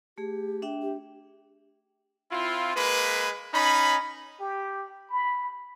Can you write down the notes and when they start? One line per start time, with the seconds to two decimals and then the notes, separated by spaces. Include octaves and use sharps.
0.18 A3 G4 G#4
0.62 D4 E5 G5
0.82 G4
2.31 C4 E4 F4
2.76 G#3 A#3 B4
3.53 C#4 D#4 B5
4.40 G4
5.09 B5